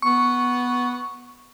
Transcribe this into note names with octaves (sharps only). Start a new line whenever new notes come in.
B3 C#6